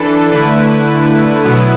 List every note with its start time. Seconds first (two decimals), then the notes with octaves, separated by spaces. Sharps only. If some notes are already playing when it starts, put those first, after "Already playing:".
Already playing: E3 D4 A4 B4
0.32 D3 A3 E4 B4
1.44 B2 F#3 B3 E4 B4